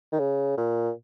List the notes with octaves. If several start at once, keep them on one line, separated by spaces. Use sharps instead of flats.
D#3
C#3
A#2